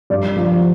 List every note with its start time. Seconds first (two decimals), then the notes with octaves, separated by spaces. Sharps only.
0.10 G2 D5
0.36 F3